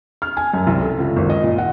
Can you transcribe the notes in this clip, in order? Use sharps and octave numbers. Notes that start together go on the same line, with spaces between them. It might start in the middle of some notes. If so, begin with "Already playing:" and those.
F6
G#5
F#2
C2
A4
C#2
G#1
D#5
A#2
F#5